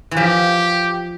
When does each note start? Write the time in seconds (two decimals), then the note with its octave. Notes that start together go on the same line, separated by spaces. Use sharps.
0.11 E3
0.17 F3 G4